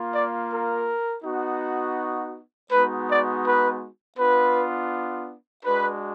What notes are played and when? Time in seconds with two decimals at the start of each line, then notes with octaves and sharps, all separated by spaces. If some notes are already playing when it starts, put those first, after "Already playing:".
Already playing: A#3 F4
0.14 D5
0.51 A#4
1.24 B3 D#4 F#4
2.71 G#3 B3 D#4 F#4 B4
3.08 D5
3.44 B4
4.17 B3 D4 F4 B4
5.64 G#3 D4 F#4 B4